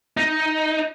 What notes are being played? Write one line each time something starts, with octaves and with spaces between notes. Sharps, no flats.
D#4